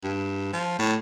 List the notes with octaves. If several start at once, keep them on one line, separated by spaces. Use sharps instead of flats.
G2
F3
A2